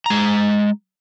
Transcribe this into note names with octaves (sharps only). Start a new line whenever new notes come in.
G#3 A#5